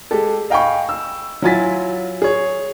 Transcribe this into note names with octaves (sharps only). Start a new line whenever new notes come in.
G#3 G4 A4
D#5 F5 G5 G#5 B5 C#6
E6
F#3 E4 F4 G#5 A6 B6
G#4 C#5